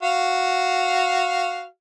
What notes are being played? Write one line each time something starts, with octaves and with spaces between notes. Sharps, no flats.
F#4 F5